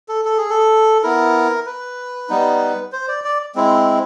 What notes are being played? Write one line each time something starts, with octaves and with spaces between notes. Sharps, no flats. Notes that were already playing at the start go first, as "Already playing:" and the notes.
A4
A4
G#4
A4
B3 E4 A#4
B4
G3 B3 D#4
C5
D5
D5
G#3 C4 E4